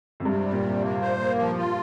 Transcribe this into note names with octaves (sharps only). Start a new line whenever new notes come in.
F2
G2 C3
G3
A#2
C3
A#3
C5
A#3
F3
F4